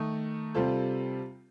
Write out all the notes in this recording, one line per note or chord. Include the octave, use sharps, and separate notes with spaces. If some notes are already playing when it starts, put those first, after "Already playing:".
Already playing: D#3 A3 D#4
C3 G3 C4 F4 A4